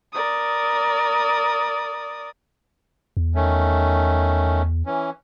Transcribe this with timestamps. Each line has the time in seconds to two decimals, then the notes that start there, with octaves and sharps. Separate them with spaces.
0.12 A#4 D5 D#6
3.17 E2
3.35 D#3 A3 C#4
4.86 E3 C#4